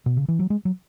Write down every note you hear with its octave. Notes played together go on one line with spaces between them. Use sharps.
B2
C#3
E3
F#3
G#3
F#3